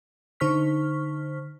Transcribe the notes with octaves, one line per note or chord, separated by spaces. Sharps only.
D3 D#4 C5 C#6 F6 B6